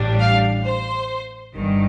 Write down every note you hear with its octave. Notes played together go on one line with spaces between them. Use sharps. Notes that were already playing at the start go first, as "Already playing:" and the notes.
Already playing: A1 A2 G3 D4
F5
C5
G1 G2 D#3